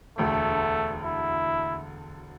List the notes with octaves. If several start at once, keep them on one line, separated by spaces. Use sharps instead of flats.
E1 D2 D3 A3
E4